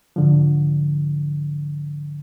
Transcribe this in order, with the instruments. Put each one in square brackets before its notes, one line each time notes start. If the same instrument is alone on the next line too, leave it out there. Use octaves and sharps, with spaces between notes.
[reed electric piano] G#2 D3 F3